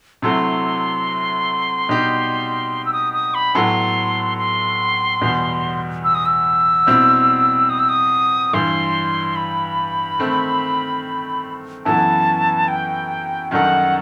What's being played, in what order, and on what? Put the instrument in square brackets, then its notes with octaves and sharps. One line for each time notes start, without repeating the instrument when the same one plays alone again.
[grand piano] C3 F#3 A3 E4 A4 [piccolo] C6
[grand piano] B2 G3 D#4 G4
[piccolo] E6
D#6
D#6
B5
[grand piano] A2 F#3 B3 E4 A4 [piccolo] C6
[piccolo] C6
[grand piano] E2 B2 G3 B3
[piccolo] E6
D#6
E6
[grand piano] B2 G3 C4 E4
[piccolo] D#6
E6
D#6
[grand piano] G2 E3 G3 [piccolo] C6
[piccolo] B5
[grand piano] D#3 A3 C4
[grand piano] F#2 E3 B3 E4 A4 [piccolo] A5
[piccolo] G5
[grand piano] F#2 D#3 G3 D#4 A4 [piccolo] F#5